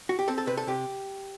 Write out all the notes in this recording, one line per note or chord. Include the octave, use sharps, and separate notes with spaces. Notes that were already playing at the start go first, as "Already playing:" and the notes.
F#4
G4
C4 A4
A4
C3 B4
A4
C3 G4